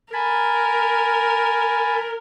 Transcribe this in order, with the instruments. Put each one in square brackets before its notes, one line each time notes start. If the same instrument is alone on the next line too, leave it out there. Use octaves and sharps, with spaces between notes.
[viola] A#4 [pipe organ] G#5 A5 B5